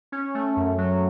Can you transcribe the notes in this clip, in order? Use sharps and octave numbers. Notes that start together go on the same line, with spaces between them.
C#4
A3
F#2
F#3